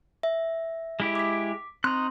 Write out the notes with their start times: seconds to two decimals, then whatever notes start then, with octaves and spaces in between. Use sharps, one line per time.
0.23 E5
1.00 G#3 E4 G4
1.15 D6 B6
1.84 C4 D#4 C6 F#6